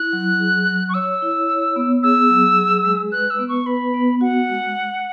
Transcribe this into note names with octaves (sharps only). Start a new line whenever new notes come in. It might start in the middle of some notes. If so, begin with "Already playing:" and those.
Already playing: E4 F#6
F#3
G#4
F#3
C#6
C#5 E6
E4
C#5
B3
G#4 E6
F#3
G#4
G#3
B4 F#6
E6
B3
C#6
B4 B5
B3
F#4 F#5
G#3